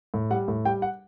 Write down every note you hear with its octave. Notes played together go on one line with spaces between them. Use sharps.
A2
G3 F#5
A2
G3 G5
F#5